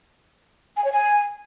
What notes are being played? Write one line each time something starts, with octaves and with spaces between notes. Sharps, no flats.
G#5
C#5
G#5